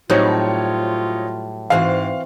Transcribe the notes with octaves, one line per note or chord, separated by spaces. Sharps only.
A2 F#3 G3 C4 D#4 F4 C#5
G#2 E3 C4 F#4 F5